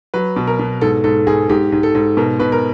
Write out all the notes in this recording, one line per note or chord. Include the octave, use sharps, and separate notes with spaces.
F#3 B4
B2
A#4
B2
G#2 A4
G#2 A4
G#2 G#4
G#2 G4
G#2
A4
G#2
B2 A#4
B2 B4
A#4